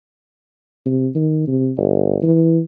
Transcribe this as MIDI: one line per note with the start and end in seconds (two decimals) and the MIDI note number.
0.86 1.08 48
1.15 1.47 51
1.48 1.71 48
1.77 2.18 31
2.23 2.60 52